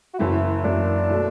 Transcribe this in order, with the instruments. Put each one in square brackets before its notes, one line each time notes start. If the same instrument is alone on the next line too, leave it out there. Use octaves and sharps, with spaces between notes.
[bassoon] F#4
[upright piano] F#1 F#2 E3 [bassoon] E4
[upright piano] F#1 F#2 E3 [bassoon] D4
[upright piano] B2 A3